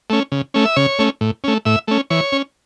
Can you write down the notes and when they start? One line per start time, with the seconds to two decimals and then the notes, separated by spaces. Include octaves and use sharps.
0.10 A3 C#4
0.32 C#3
0.54 A3 C#4
0.65 E5
0.76 C#3 C#5
0.99 A3 C#4
1.21 A2
1.44 A3 C#4
1.65 A2 E5
1.88 A3 C#4
2.10 E3 C#5
2.32 C#4